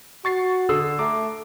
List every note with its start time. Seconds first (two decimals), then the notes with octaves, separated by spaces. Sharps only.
0.25 F#4 C#6 A6 C7
0.69 D3 D#6 E6 C7
0.99 A3 A#5 D6